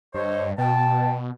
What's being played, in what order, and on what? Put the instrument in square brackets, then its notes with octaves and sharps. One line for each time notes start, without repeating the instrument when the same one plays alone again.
[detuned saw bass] G2 [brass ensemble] D3 C5 C#5 [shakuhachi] D#5
[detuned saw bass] B2 [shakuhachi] G5 [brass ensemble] A5